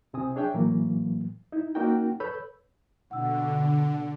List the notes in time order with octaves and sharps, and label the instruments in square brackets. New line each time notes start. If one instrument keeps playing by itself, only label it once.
[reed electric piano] C2 C3 C4 G#5 D#6
D4 G#4 C#5 E5 G5
A2 E3 F#3 A3 A#3
D#4 E4
A#3 C#4 D#4 F#4 A#4 G5
A4 B4 C#5 B5 E6 G6
[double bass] B2 [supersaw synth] D3 [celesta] F#5 E6